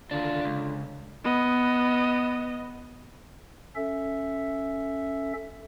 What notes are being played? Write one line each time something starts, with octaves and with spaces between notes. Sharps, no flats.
D#2 D3 D4 F4
C#2
B3 D#5
C#4 A4 E5